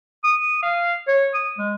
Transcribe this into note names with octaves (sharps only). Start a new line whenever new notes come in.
D#6
F5
C#5
D#6
G#3